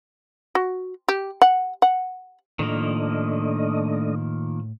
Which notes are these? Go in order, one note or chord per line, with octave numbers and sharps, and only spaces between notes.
F#4
G4
F#5
F#5
A2 D#3 F3 A3 A#3 D4 D#5